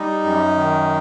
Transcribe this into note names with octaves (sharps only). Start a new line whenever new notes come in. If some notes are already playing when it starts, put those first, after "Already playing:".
Already playing: G3 D#4
F#2
D#3